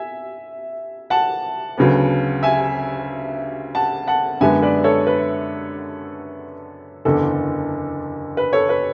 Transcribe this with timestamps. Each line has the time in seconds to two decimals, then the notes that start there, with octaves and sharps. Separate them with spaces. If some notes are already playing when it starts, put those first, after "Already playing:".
Already playing: E5 G#5
1.10 F#5 A5
1.77 D2 C#3 F#3 B3
2.43 E5 G#5
3.75 F#5 A5
4.08 F#5 A5
4.41 F#2 D3 G#3 B3 E5 G#5
4.63 B4 D5
4.84 A4 C#5
5.07 B4
7.05 F#1 E2 D3 A4
8.37 B4
8.53 A4 C#5
8.69 B4